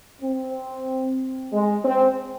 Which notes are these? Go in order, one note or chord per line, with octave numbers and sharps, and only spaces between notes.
C4
G#3
C4